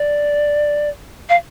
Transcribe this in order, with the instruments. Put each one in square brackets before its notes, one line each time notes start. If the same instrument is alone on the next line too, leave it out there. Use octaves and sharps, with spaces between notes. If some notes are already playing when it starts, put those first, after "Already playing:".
Already playing: [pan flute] D5
F5